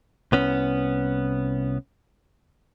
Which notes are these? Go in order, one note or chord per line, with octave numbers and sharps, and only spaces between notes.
C2 B3 C#4